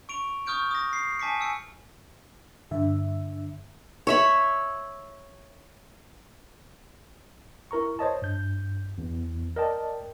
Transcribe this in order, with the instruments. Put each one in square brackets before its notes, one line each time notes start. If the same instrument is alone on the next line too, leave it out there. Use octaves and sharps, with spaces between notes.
[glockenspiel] C#6 D7 F7
C#6 D#6 F6 G6 D7
D#6 A#6
C7
G#5 A5 D6 B6 C#7
G#5 E6 C#7
[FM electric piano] G2 D3 E5
[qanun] C#5 E5 B5
[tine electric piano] E4 A#4 A#5 C#6
C5 C#5 D#5 A5
G2 G6
E2
A#4 D5 D#5 G5 A5